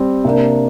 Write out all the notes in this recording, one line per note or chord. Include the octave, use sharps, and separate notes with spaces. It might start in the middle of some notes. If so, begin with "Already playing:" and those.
Already playing: G3 C4 G4
C3 A#3 D4 A#4